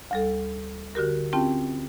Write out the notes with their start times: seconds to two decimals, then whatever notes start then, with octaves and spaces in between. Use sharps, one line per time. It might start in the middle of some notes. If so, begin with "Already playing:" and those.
0.11 D2 G3 A4
0.95 D3 F#4 G4 A#4
1.33 C4 C#4 F4 G4 G5 A5